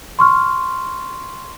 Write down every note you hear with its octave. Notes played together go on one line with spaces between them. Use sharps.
C6 C#6 F6